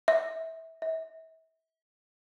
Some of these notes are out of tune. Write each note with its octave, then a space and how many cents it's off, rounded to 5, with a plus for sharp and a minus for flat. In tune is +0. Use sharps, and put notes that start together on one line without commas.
E5 -20
E5 -35